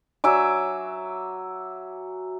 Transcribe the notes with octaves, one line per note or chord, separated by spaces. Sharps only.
F#3 E5 G#5 D6